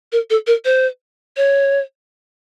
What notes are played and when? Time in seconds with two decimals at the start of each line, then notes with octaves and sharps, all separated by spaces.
0.12 A#4
0.30 A4
0.47 A#4
0.65 C5
1.37 C#5